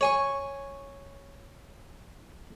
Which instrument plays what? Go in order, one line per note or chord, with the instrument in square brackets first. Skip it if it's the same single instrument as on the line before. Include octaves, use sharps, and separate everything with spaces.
[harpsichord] C#5 G#5 C#6